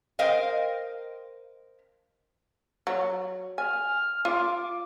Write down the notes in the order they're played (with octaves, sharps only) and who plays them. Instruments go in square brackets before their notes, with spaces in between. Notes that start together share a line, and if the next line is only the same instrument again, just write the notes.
[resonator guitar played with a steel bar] A#4 C5 D#5 F5 G5
[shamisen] F#3
[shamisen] G#5 [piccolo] F6
[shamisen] F4 [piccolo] D6